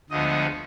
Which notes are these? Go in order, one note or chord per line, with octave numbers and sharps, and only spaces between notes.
D2 D3 F3 G#3 B3 D#5